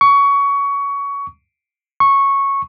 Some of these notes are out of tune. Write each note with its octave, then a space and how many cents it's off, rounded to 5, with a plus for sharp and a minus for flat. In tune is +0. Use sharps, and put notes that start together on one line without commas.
C#6 +20
C#6 -10